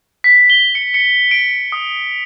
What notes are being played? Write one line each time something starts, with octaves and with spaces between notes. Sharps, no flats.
B6
G7
C#7
C#7
D7
D#6